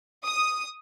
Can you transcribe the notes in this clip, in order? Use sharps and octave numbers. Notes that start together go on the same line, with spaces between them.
D#6